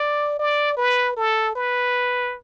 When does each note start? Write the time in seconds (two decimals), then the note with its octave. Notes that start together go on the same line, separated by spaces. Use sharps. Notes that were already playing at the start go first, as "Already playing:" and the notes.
Already playing: D5
0.39 D5
0.77 B4
1.17 A4
1.56 B4